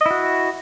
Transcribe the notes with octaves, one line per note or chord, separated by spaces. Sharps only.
E4 F#4 D#5